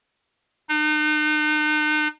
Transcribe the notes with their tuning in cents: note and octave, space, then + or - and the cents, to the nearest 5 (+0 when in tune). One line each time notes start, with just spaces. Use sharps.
D#4 -40